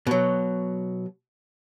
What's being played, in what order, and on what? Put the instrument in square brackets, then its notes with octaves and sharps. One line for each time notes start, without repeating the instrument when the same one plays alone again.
[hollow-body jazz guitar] B2 F#3